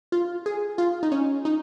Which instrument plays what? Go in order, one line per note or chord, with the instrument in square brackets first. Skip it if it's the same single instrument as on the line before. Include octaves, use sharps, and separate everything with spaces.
[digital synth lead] F4
G#4
F4
D#4
C#4
D#4